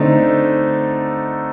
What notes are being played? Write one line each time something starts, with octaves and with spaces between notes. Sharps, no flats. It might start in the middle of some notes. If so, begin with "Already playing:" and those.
Already playing: D3 A3 C4 D#4